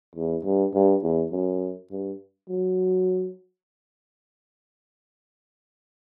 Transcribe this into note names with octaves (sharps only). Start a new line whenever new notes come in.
E2
G2
G2
E2
F#2
G2
F#3